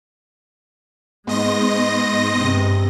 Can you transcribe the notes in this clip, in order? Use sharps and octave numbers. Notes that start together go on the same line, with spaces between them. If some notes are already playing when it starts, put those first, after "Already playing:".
G#2 G#3 B3 D#5 C6 A#6
G2 C3